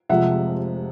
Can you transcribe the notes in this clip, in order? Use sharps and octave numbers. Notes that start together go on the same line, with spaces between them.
F1 F2 C3 F3 G#3 E5 F#5